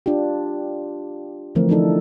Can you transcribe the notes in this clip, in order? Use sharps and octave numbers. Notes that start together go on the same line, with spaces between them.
D4 F4 G4
D3 E3 F3 A3 C4 A#4
E3 F3 D4 D#4 A4